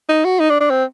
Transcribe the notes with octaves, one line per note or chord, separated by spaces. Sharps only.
D#4
F#4
D#4
D4
D4
C4